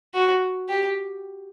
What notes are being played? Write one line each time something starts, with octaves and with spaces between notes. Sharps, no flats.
F#4
G4